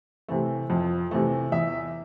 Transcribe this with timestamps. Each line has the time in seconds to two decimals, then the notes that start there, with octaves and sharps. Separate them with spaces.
0.28 C3 E3 A3
0.70 F2
1.11 C3 E3 A3
1.52 E2 E5